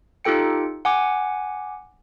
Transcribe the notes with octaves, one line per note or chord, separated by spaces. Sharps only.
D#4 F4 G4 A4 G5 C#7
F#5 G#5 D6